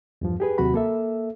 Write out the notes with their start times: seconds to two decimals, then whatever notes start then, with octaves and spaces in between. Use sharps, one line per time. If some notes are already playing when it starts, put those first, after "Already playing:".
0.21 E2 G2 F3
0.40 G4 G#4 B4
0.58 D#2 C3 F#3 F#4 B5
0.74 A#3 A4 E5